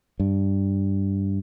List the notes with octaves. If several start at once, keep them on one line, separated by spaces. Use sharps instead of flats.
G2